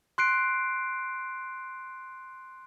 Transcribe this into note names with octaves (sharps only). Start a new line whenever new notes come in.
C6 F#6 C7 D7